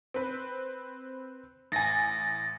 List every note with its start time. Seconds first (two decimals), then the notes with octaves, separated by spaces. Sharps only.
0.14 C4 B4
1.72 A1 G#5 A6 A#6